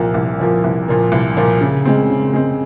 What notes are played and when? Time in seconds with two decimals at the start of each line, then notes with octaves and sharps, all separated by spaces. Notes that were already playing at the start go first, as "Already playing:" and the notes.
Already playing: C2 A#2 F3 A#3
0.14 C2
0.40 A#2 F3 A#3
0.64 C2
0.88 A#2 F3 A#3
1.12 C2
1.37 A#2 F3 A#3
1.61 C#3
1.85 G#3 C4
2.10 C#3
2.34 G#3 C4